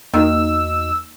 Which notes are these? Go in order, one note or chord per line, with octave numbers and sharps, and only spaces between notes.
E2 D#3 A#3 D#4 F#4 E6